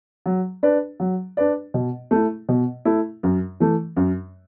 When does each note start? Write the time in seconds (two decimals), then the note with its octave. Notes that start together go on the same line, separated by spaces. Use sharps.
0.26 F#3
0.63 D4 B4 D5
1.00 F#3
1.37 D4 B4 D5
1.74 B2
2.11 A3 E4
2.49 B2
2.85 A3 E4
3.23 F#2
3.60 E3 A3
3.97 F#2